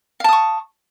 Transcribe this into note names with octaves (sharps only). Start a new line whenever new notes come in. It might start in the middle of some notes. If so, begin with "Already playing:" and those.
F5 A5 C#6 D#6